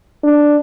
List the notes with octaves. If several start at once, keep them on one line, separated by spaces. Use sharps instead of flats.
D4